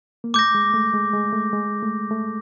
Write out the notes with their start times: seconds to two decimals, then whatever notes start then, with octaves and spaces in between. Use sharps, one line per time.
0.24 A#3
0.34 A3 D6 G6 A#6
0.55 G#3
0.74 A3
0.93 G#3
1.14 G#3
1.33 A3
1.53 G#3
1.83 A3
2.11 A3